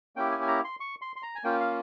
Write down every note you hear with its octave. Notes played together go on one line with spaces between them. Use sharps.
A#3 C#4 E4 G4 G5
G#5
G#5
A#5
C6
C#6
C6
C6
A#5
G#5
A#3 C#4 F4 G5
F5